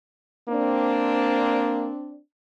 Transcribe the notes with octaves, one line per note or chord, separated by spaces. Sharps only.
A#3 C4 D4